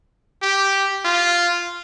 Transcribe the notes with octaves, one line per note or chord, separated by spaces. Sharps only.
G4
F4